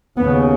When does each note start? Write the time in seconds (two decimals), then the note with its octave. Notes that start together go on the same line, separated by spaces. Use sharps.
0.18 D#2 C#3 B3